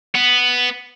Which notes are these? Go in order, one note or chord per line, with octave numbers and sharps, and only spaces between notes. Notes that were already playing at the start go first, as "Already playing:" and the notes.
B3